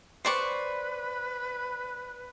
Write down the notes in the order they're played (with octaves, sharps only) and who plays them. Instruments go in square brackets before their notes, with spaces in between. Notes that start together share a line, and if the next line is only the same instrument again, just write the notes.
[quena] B4 [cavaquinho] C5 D5 C#6